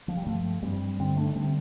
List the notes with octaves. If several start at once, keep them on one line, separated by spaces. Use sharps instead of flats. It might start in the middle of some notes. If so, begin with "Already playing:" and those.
F3
G3
G2 F3 A3
G2 G3 C4
D3 G3 C4
A3 D4
D4
D3 G3 C4